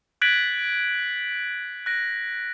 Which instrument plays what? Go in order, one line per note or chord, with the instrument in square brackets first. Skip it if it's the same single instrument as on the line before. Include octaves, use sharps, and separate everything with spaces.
[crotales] F#6 G#6 A6 B6 D7 F#7
F#6 A#6 D7